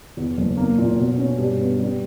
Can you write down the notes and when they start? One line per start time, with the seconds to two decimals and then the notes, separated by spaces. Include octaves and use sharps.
0.17 E2
0.37 F#1
0.57 A#3
0.78 A#2
0.97 B2
1.18 C#4
1.38 G2
1.59 B3
1.79 G3